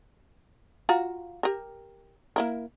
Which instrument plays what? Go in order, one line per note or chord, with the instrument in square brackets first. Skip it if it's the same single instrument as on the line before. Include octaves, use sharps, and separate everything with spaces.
[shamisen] F4 F#4 A#5
G4 A#4
A#3 E4 A#4